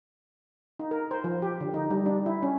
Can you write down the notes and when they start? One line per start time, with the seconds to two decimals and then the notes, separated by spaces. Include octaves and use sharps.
0.79 D#4
0.91 A#4
1.11 C5
1.24 F3
1.42 G4
1.61 D3
1.74 D#4
1.90 G3
2.06 D4
2.26 E4
2.43 C#4